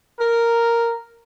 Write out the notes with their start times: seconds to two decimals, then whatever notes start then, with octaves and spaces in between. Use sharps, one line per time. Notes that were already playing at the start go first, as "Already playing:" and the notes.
0.20 A#4